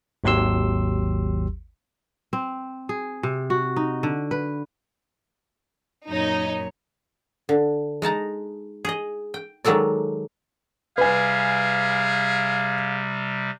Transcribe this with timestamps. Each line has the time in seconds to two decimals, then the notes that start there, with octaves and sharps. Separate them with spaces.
0.24 G#1 D#2 F#3 G4 C6 E6
2.33 C4
2.89 G#4
3.23 C3
3.50 F#4
3.76 D#4
4.03 D3
4.31 B4
6.08 F#2 A#2 D#4 C#5
7.49 D3
8.02 G#3 D#4 A5 A#5
8.85 G#4 D#5
9.34 G5
9.65 D#3 F#3 G#3 A4 D5
10.98 C3 G3 G#4 B4 F5 G#5